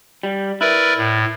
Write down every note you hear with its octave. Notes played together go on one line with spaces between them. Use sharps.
G3
E4 A#4 B4 D5
A2